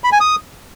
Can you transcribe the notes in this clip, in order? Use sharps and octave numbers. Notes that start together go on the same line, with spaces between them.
B5
G#5
D#6